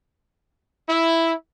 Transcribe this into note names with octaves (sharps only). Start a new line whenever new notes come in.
E4